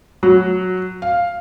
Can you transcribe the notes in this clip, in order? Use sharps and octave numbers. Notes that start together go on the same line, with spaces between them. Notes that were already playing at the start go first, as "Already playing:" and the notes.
F#3
F5